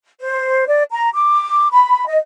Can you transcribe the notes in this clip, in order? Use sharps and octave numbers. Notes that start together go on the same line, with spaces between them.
C5
D5
A#5
D6
B5
D#5